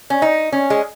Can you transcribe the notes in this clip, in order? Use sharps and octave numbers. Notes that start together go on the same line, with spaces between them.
C#4
D#4
C#4
G#3